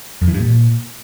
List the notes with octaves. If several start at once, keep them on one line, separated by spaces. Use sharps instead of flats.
F2
E3
G2
A#2